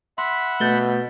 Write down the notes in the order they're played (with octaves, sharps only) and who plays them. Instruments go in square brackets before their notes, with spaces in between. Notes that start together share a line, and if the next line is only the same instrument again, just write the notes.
[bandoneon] E5 F#5 B5 [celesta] C6
[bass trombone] B2 [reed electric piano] A3 [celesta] G6 A6 G7